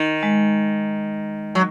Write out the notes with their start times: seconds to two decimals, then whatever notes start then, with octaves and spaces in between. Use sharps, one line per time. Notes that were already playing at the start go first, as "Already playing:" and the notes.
Already playing: D#3
0.23 G#3
1.55 F#3